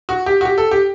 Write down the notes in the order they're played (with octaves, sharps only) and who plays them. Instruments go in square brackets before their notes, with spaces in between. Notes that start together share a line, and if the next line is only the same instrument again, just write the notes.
[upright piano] F#4
G4
F#4
G4
A4
G4